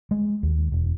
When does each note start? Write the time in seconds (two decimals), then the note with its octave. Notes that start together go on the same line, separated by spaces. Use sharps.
0.11 G#3
0.43 D#2
0.72 E1